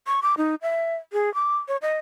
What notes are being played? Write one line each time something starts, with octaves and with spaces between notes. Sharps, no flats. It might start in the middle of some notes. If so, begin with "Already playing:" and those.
C#6
D6
D#4
E5
G#4
D6
C#5
D#5